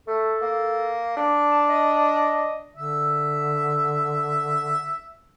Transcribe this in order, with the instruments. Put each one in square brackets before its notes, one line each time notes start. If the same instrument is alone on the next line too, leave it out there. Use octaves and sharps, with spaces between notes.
[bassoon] A3 [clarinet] A4
[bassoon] A#3
D4
[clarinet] A5
D#5
[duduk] D3 [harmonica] E5